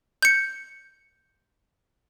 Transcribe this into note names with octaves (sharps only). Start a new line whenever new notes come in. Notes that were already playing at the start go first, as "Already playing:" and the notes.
G6 C#7